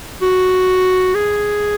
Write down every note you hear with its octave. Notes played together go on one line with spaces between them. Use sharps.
F#4
G#4